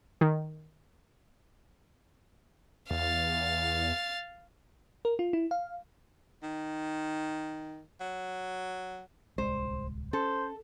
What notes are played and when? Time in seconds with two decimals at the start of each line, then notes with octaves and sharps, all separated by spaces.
0.21 D#3
2.91 E2 F5 A6
5.05 A#4
5.19 F4
5.33 E4
5.51 F5
6.43 D#3
8.00 F#3
9.38 D1 C2 G#3 C5
10.13 C#4 A4 C5